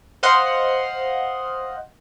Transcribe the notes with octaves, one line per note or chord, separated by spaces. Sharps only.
C5 D#5 F5 F#5 C6